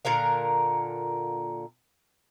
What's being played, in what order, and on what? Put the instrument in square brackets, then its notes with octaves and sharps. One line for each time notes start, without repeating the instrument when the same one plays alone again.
[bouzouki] A#2 D3 A#4 F5